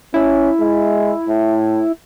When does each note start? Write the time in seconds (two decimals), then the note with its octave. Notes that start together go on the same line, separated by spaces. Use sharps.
0.14 C#4 E4
0.60 G#3
1.28 A2